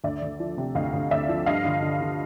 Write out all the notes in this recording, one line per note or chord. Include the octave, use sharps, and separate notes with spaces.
D2 D5 E5
D2
F3
C3
D2 D#5 F5
D2
D2 D5 E5
F3
G2 D#5 F5
D3
D3
D3